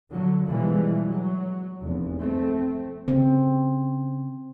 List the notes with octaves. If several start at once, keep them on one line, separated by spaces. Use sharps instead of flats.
D3 F#3
B2 E3 F3 G3 G#3
F#3
F1 E2
A3 C4
C#3 C4